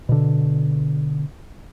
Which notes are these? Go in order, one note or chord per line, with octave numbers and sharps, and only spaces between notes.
B2 D3